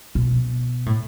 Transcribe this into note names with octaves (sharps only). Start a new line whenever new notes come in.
B2
A2